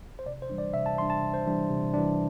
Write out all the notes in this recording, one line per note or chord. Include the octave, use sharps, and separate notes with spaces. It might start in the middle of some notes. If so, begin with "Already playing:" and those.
C5
C3 D5
C5
E3 G3 D4
D5
C3 E5
A5
E3 G3 D4 C6
A5
C3
C5
E3 G3 D4
C3
E3 G3 D4